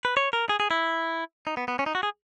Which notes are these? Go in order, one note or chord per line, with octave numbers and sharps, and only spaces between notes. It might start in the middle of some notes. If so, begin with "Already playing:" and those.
B4
C#5
A#4
G#4
G#4
E4
D#4
B3
B3
C#4
D#4
F#4
G#4